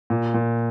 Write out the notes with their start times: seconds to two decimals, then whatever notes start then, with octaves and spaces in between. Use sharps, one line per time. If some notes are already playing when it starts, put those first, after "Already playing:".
0.10 A#2
0.34 A#2